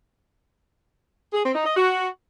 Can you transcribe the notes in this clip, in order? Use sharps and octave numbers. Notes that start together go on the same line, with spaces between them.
G#4
C4
D#4
D#5
F#4